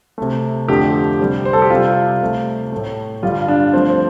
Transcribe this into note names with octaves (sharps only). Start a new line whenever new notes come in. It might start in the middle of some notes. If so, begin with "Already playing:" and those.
C3 A3
F2 D3 F3 A3 G4
C3 G3
C5
A4
G4
C3 G3 F4
C3 A3
A2 A3
G2 D3 G3 F4
D4
G2 F3 A3 C4
C4